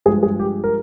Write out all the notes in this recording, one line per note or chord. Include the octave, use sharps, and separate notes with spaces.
G2 F3 G#3 G#4
G#4
G4
A#4